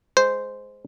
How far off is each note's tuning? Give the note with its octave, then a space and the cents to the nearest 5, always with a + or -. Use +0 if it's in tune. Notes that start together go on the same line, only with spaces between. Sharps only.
G#3 +0 C5 -10